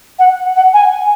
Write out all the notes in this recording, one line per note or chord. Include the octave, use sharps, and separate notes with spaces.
F#5
F#5
G#5